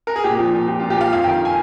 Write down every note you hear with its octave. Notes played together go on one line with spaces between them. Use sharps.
A#4
G#4
A#2 G4
F3
A#2
F3 G4
A#2 F4
G4
F3 F5
F2 F5
D#3 G5
G#5